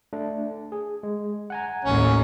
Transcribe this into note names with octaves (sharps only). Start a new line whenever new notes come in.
A3 D4
G#4
G#3
F#5 G#5 A#5
A1 D#2 A2 C#4